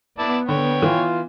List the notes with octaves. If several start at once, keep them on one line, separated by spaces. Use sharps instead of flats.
B3 E4 D5 A5
D3 C#5 G5
E3 F4